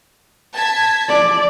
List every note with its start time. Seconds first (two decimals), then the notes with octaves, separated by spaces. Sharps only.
0.55 A5 G#6 B6
1.09 D5